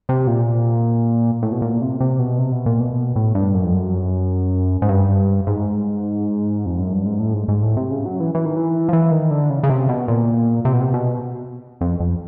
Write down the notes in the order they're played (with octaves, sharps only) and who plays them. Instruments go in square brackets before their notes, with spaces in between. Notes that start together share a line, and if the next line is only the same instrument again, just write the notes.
[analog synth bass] C3
A#2
A2
B2
A#2
C3
C3
B2
C3
B2
A#2
B2
A2
G2
F#2
F2
F#2
G#2
G2
G#2
F2
F#2
G2
G#2
A2
G#2
G#2
A2
C3
C#3
F#3
E3
E3
D#3
E3
F3
E3
D#3
D3
C#3
C#3
C3
B2
A#2
C3
B2
C3
B2
F2
F2